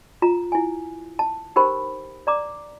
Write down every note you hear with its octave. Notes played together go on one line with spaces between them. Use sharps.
F4 A#5
E4 G#5
A5
D#4 G4 A#4 C5 G5 B5
D5 A#5 D6